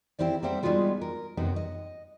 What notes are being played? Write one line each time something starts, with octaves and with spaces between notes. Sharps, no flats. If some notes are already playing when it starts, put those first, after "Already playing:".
C4 D#4 E4 G4 C5 D5
G3 A#3 C4 C5 E5 F#5
G3 G#3 B3 D#4 F4 F#4
A#4
F#2 C3 F#3 B3 D#4 F#4
D#5